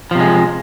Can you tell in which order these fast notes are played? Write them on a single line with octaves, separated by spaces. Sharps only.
F3 C3 G#3